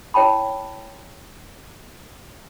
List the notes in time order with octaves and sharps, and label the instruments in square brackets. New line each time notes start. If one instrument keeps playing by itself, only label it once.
[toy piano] E4 C#5 G5 A5 B5